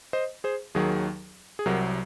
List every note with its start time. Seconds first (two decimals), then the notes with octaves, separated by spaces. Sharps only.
0.13 C5 D#5
0.44 G#4 C5
0.75 D#2 D#3 F#3 G#4
1.59 G#4
1.66 C2 C3 F#3 A#4